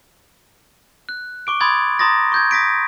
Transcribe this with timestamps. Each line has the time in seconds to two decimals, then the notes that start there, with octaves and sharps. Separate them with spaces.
1.09 F#6
1.47 C#6 D6 D7
1.60 B5 C6 D#6 G#6 A6
1.99 A#5 C6 D#6 A6 A#6
2.32 C#6 G6 G#6
2.51 D#6 A#6 B6 D7